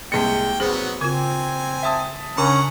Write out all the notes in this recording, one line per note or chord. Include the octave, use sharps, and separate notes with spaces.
C2 G#3 A#3 C4 G5 C#7
G#1 F#3 B3 G#4 C5
C#3 C4 F4 G#5 G#6
E5 A5 D#6
C#3 C#4 D4 F#5 A#5